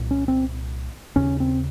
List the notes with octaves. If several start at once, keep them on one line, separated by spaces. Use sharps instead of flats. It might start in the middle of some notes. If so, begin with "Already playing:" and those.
Already playing: C2 A#2
C#4
C4
D#2 C#3 C#4
C4